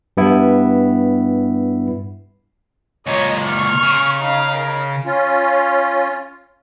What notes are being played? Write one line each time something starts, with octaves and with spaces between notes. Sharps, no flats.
G2 B3 E4
C#2 A#2 C#5 D#5
C#6 F6
C#3
D#4 F5
A#4
C#4 F4